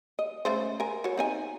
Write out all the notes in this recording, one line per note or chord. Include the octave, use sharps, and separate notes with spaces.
D#5
C#3 A3 C5
A#4 G#5
F#4 C#5
C4 D#4 G#5